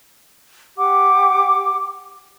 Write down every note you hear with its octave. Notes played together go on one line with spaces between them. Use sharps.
G4 F#5 D6